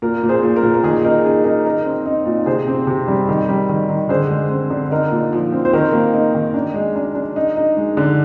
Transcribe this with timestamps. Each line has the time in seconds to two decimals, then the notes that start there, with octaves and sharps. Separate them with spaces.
0.02 A#2 A#4
0.23 A#2
0.29 G#4 C5
0.43 A#2
0.56 A#4
0.63 A#2
0.74 A#4
0.83 D#3 G#4
1.04 D#4 A#4
1.25 D#4 G#4
1.44 D#4 A#4
1.65 D#4 A#4
1.85 C4
2.06 D#4
2.26 A#2
2.46 C3 G#4 C5
2.68 C4
2.87 C3
3.08 G3
3.29 D#3
3.49 G3
3.69 D#3
3.89 D#3
4.09 D3 G#4 C5
4.30 G#3
4.50 C4
4.70 D3
4.91 D#4 A#4
5.11 A#2
5.33 F3
5.52 C4
5.65 C5
5.73 D#3 A#4
5.93 A#3
6.14 D#4
6.35 D#3
6.54 D4
6.74 G#3
6.96 D4
7.15 D4
7.36 D#4
7.56 D#4
7.77 G#3
7.97 D3